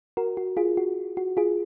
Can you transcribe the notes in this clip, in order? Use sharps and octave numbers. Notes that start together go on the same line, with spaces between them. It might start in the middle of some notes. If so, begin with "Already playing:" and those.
F#4 A#4
F#4
F4 G#4
F#4
F#4
F4 G#4